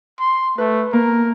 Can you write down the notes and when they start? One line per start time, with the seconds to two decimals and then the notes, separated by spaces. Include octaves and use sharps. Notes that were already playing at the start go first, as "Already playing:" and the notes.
0.19 C6
0.58 A3 B4
0.93 A#3 A#4